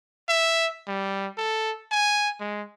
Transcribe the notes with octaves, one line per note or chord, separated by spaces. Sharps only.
E5
G3
A4
G#5
G#3